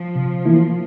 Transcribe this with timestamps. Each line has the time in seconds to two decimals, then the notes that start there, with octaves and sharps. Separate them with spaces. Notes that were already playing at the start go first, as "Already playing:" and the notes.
Already playing: F3
0.15 C3
0.45 E3 A#3 E4